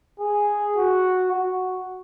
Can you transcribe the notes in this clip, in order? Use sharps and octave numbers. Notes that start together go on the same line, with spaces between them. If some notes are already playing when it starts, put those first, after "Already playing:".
G#4
F#4
F#4